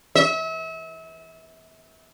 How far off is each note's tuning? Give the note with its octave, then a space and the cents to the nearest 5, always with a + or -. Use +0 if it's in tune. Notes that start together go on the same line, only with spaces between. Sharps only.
E5 -35